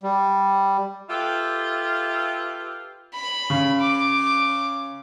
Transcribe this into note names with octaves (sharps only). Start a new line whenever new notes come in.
G3
F4 G4 A4 B4 E5
B5
C#3
D6